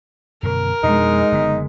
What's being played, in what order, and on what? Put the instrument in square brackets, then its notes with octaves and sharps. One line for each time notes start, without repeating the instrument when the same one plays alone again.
[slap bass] F#2 B2 D3 [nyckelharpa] A#4
[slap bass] F2 B2 D4 [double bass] G#3 [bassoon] D#4
[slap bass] F#1 D3 B3